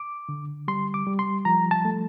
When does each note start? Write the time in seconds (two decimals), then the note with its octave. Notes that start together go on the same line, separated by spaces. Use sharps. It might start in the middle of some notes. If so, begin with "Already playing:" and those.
Already playing: D6
0.29 D3
0.68 G3 C6
0.94 D6
1.07 G3
1.19 C6
1.45 F3 A#5
1.71 A5
1.85 A3